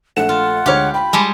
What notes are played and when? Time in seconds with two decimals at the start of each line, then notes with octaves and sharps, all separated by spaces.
0.17 A#1 A3 F#5 E7
0.29 F4
0.66 D2 G#3 G4 C#5 F5
0.94 G5 B5
1.13 G3 G#3 G4 G#5 A5